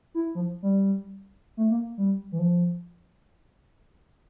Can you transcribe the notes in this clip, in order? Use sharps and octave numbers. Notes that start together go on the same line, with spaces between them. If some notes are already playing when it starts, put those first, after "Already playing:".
E4
F3
G3
A3
A#3
G3
E3
F3